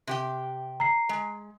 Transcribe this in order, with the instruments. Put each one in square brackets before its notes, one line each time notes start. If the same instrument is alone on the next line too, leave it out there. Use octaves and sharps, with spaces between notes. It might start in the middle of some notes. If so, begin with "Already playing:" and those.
[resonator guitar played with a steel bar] C3 G4 G5
[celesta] A#5 C7
[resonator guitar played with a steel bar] G#3